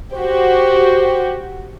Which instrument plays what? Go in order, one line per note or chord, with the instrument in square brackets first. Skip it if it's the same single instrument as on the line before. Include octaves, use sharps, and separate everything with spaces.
[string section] F#4 G4 [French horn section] C5